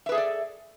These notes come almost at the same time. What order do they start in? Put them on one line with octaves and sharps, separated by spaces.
E5 B4 G#4 A4 D5